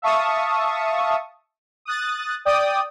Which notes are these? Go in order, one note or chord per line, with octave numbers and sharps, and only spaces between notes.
E5 F5 A5 C#6 D#6
D#6 F#6 A6
D5 G5 D#6